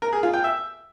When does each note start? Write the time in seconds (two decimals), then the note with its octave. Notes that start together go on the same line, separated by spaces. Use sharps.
0.02 A#4
0.13 G#4
0.23 F4
0.34 G5
0.44 E5